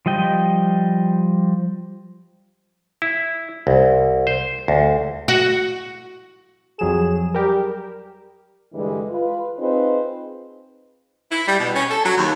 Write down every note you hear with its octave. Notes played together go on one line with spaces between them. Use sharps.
F3 G3 D#5 G5
E4
C2
C5
D2
F#4
F2 F#3 G#4 E7
G3 G4 A#4
G2 D3 E3 G3 G#3
F4 B4
C4 D#4 F4 G#4 B4 C5
E4
G3
B2
C#4
A4
F#3
D#2